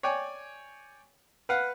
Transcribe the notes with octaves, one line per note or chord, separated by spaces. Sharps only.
C#5 D5 G5 G#5
B4 F5 F#5